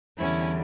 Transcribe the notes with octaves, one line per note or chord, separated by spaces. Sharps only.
E2 D3 G3 C#4 E4